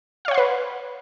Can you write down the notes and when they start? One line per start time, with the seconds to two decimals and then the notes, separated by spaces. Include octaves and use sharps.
0.25 F5
0.28 C#5
0.31 F#5
0.34 C6
0.38 B4